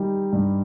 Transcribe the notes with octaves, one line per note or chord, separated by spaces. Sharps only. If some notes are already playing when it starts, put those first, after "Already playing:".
Already playing: D#3 G3 D#4
G2